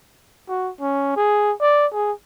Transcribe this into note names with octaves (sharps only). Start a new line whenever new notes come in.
F#4
C#4
G#4
D5
G#4